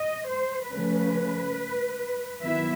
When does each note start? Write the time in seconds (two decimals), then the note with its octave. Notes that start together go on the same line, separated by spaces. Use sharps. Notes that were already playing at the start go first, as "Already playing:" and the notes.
Already playing: D#5
0.29 C5
0.71 C#3 F3 A3 C#4 B4
2.42 D#3 F#3 B3 E4 E5